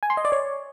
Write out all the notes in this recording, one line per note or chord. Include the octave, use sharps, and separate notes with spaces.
G#5
C6
D#5
D5
C#5